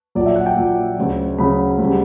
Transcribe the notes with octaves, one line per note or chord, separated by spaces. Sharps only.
A#1 A#2 F#3 D5
E5
F#5
G5
A#1 A#2 F#3
D2 C#3 F#3
D2 C#3 F#3 B5
D2 C#3 G3